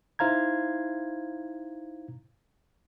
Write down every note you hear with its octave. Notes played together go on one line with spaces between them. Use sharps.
D#4 E4 C5 F5 A#5 G#6